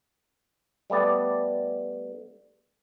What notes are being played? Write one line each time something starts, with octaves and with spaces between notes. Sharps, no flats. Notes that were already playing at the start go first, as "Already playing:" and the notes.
G3 A3 B3 D5